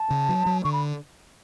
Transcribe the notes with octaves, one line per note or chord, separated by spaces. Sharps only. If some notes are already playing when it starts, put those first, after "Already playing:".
Already playing: A5
C#3
F#3
F#3
D3 C#6
B5